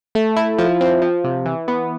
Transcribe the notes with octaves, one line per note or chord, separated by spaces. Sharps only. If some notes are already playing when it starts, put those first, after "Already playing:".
A3
E4
F3
C4
F3
C3
E3
B3